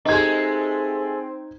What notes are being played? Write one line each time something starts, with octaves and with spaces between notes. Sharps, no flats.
G#3 A3 C4 D#4 G4 D#5 G#6